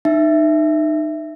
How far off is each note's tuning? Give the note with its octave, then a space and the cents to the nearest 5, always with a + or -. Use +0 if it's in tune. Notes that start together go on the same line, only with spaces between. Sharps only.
D#4 -25 E5 +0